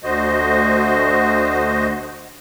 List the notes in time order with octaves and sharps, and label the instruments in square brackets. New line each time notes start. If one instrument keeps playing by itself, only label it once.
[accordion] D2 D3 F#4 C5 D#5